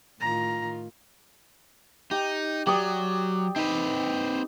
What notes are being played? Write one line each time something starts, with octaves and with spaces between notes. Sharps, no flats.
A2 D#3 F4 A#5
D#4 G4
F#3 G4 D5 D#6
C4 D#4 B4